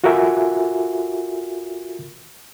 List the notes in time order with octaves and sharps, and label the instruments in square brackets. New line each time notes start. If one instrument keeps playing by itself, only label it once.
[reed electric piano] F4 F#4 A4 A#4 E5 G#5